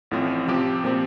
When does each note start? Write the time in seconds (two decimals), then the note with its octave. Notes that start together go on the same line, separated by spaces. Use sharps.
0.11 A1 A2 F3 C4
0.47 C3 F3 C4 G4
0.84 A#2 F3 C4 G4